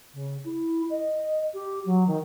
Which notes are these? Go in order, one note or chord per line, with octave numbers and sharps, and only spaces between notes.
C#3
E4
D#5
G4
F#3
D#3